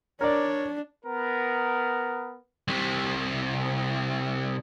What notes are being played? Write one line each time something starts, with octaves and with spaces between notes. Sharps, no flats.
D4 A#4 C#5 D5
B3 A#4
C2 C3